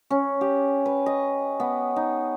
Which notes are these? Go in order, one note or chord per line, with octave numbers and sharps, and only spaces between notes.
C#4
G4
B4
D#5
B3
D#4